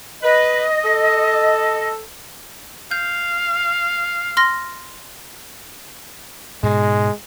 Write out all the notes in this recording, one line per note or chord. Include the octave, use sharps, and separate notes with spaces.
B4 D#5
A4
F5 G6
C6 F6 A#6
G#2 B2 G#3